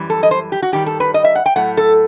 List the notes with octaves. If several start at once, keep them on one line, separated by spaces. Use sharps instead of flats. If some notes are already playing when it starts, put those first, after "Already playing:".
Already playing: F#2 E3 G3
A4
D#5
C5
G4
F#4
G2 D#3 G3 G4
A4
B4
D#5
E5
F#5
G5
A2 F#3 A3 F#5
A4